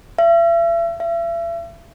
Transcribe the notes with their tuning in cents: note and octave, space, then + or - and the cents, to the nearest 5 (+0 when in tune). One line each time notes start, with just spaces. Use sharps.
E5 +40
E5 +40